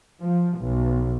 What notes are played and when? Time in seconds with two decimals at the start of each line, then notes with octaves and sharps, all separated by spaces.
0.21 F3
0.58 B1